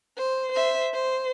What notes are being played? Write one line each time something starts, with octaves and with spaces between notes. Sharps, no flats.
C5
C5 E5
C5